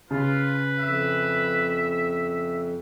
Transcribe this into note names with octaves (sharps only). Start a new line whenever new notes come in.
C#3 F4 B4
F2 E5